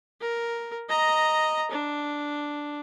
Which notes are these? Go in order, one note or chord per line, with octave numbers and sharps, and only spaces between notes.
A#4
D#5 A#5
D4